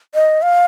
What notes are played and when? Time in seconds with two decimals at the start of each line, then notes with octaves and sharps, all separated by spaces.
0.15 D#5
0.42 F5